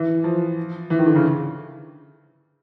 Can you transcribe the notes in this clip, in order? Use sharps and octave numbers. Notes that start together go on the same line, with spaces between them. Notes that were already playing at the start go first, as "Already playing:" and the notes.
Already playing: E3
F3
E3
D#3
D3
C#3